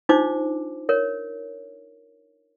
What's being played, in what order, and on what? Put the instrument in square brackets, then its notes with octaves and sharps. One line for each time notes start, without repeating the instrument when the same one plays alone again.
[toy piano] D4 D#4 F4 C5 D6
A#4 C#5